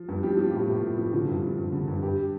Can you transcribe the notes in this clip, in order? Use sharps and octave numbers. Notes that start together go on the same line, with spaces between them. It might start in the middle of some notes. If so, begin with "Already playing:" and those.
Already playing: F3
G2
F3 G4
F3 F4
A2 G4
A2
A2
F3
D3 F4
G2
F3
G2
D3
G2
G2 G4